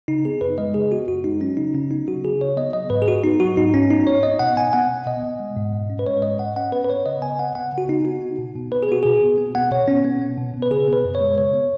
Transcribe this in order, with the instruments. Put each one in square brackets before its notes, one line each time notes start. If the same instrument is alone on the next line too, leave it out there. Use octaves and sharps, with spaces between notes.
[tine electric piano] C#3 D#4
B3 G#4
F#2 B4
G#3 D#5
C#3 G#4
B3 F#4
F#2 F#4
G#3 D#4
F#3 C#4
C#3 D#4
C#3 C#4
B3 D#4
F#3 F#4
C#3 G#4
C#3 C#5
B3 D#5
F#3 D#5
G#2 B4
G#4
G#2 F#4
B3 D#4
F#3 F#4
G#2 D#4
G#2 C#4
B3 D#4
B3 C#5
B3 D#5
B2 F#5
B2 G#5
B3 F#5
B3
B2 D#5
B2
G#3
G#2
G#2
C#4
B4
G#3 C#5
G#2 D#5
G#2 F#5
C#4 F#5
B3 B4
B4
B3 C#5
C#3 D#5
C#3 G#5
B3 F#5
B3 F#5
C#3 F#4
C#3 D#4
B3 F#4
B3
B2
B2
B3 B4
G#4
B3 F#4
B2 G#4
B2
B3
B3 F#5
B2 C#5
B2 C#4
B3
B3
B2
B2
B4
C#3 G#4
B3
B4
F#2
C#5
G#3
C#3 C#5
B3